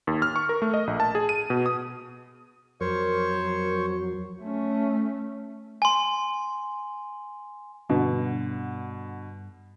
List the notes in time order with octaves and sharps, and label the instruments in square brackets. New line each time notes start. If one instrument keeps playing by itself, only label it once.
[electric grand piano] D#2
F6
C#6
A#4
A3
D#5
A#1
A5
G#4
D#7
B2
D#6
[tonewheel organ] F2 F#3 [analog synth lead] A#4 [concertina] C5 C#5 C#6
[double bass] A3 C#4
[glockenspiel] G#5 C6
[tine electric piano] G2 [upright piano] B2 D3